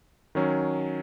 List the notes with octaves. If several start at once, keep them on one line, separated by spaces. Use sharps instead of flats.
D#3 F#3 C#4